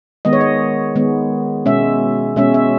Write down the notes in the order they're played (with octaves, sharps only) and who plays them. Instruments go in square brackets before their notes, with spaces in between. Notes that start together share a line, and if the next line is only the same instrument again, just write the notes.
[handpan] D#3 G#3 B3 D#5
C#5
D#5
D#3 G#3 B3
B2 G#3 C#4 E5
B2 G#3 C#4 E5
E5